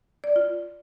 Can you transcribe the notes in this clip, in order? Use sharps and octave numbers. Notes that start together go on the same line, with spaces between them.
D5
F4